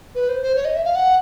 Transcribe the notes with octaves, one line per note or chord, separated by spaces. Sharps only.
B4
C5
C5
C#5
D#5
E5
F5
F#5